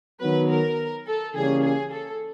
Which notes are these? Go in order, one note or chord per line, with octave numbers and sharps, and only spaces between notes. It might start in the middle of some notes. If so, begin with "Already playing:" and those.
D#3 F#3 B3 B4
A#4
A4
C#3 E3 G3 A#3 C#4 G#4
G#4
A4